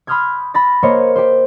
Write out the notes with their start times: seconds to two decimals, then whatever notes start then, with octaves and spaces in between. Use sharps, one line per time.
0.07 B5 C6 D#6 F6 G6 G#6
0.54 B5 A6 A#6
0.83 A#3 C5 C#5 D#5
1.16 G4 C5